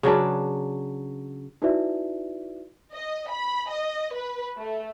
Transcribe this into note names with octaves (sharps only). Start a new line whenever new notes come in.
C#3 F#3 D4 B4
D#4 E4 F#4 B4 D5 E5
D#5
B5
D#5
B4
A3